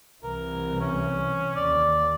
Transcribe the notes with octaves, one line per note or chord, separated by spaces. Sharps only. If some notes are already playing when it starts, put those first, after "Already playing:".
C2 E3 A#4
C#4
D#2 D5